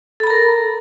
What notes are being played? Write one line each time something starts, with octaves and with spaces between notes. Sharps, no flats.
A4 A#4 A#5 B5